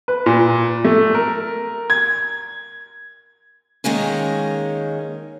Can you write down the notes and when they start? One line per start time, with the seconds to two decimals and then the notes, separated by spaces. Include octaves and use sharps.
0.08 B4
0.26 A#2
0.85 A3
1.15 A#4
1.90 G#6
3.84 D#3 G#3 A#3 C#4